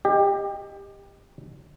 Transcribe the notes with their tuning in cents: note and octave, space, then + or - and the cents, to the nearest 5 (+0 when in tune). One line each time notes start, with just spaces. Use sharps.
G4 +20 D#5 +0